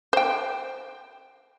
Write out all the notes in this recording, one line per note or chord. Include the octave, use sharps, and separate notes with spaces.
C5 G5